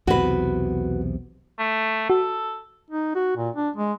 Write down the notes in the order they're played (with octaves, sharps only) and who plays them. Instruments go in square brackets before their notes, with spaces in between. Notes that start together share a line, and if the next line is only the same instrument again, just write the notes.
[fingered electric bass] B1 E2 C3 [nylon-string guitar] F#4 B4
[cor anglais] A3
[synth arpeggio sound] F#4 [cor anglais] A4
[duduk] D#4
F#4
A#2
D4
G#3